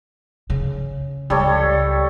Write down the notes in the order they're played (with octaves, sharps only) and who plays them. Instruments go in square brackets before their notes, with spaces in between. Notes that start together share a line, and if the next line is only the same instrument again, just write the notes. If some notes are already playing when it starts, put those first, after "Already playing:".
[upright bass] C#3
[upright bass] C#2 [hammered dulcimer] G3 A4 C#5